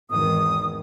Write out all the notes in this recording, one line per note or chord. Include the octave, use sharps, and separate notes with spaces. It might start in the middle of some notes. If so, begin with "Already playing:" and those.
G#1 E2 D#3 D#6